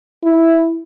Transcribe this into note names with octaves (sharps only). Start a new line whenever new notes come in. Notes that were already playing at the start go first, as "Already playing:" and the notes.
E4